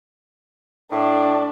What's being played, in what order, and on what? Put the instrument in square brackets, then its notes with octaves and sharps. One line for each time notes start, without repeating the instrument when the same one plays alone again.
[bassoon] A2 [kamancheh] D4 D5